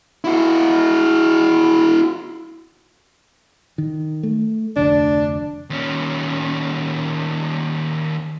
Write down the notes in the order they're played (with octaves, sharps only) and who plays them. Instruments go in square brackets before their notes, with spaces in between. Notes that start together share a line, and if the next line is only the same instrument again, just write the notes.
[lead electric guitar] E4 F#4
[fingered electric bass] D#3
A3
[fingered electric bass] F1 D2 [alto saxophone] D4
[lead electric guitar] D#2 C#4